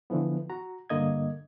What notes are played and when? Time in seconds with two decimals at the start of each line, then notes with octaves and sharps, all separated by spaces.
0.10 D3 E3 F3 B3
0.50 F#4 A#5
0.90 G2 D3 A#3 D#5 G#6